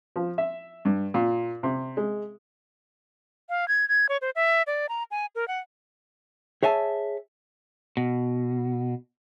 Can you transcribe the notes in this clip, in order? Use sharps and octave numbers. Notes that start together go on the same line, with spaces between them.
F3
E5
G2
A#2
C3
G#3
F5
G#6
G#6
C#5
C5
E5
D5
A#5
G#5
A#4
F#5
G#4 C#5 E5 G#5 A5
B2